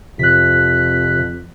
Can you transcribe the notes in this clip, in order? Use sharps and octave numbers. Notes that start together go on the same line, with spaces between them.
F2 C3 F#6 B6